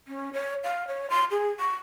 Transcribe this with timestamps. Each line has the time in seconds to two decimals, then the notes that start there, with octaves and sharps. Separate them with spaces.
0.08 C#4
0.33 C#5
0.64 F5
0.88 C#5
1.10 C6
1.31 G#4
1.60 C#6